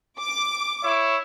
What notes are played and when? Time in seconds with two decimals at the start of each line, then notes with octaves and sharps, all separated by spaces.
0.19 D6
0.83 E4 C#5 E5